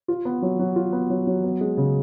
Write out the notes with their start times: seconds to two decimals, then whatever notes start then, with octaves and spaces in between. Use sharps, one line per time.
0.08 F4
0.25 B3
0.42 F#3
0.59 F#3
0.76 F4
0.93 B3
1.10 F#3
1.27 F#3
1.44 B3
1.61 G#3
1.77 C#3